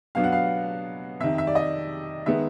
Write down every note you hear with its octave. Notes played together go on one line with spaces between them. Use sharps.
B2 F#3 B3 D4 F5
F#5
F5
F2 C3 D#3 E5
E5
D5
D#5
D#3 G#3 B3 E5